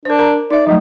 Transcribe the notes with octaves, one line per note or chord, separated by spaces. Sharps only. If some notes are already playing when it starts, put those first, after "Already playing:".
D4 A#4 C5
A#4 A#5
D#4 D5 E5
F3 F#3 A3 D#4